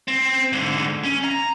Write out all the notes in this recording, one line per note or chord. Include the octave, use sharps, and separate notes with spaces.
C4
G#2 D3
C#4
A#5